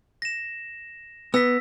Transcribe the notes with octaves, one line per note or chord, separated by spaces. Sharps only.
A#6 E7
B3 E6 A#6 B6